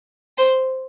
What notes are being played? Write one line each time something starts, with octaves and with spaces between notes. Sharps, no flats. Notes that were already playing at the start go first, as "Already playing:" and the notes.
C5